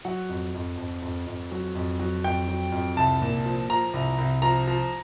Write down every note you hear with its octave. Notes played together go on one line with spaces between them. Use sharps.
F#3 F#5
F2
F2
F2
F2
F2
F#3
F2
F#3
F2 G5
F#3
F2
C2 A5
A#2
F3
F3 A#5
C2
C2
F3 A#5
F3